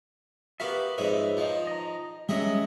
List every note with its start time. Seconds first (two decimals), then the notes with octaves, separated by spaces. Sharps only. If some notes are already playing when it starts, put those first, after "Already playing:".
0.60 B3 F#4 G4 A#4 E5 F5
0.98 F2 G#2 B4 C#5 D#5 E5
1.37 D#3 F3
1.67 D#5 A#5
2.29 F#2 G3 G#3 C#4 D#5 E5